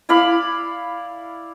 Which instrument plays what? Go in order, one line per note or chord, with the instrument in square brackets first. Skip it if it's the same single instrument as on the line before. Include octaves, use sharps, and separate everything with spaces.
[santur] E4 D5 F5 B5